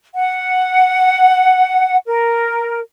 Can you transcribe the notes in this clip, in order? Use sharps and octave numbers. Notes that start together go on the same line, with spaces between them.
F#5
A#4